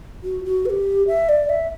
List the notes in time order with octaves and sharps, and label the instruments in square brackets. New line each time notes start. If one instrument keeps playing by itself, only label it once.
[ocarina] F#4
F#4
B4
G4
E5
D5
E5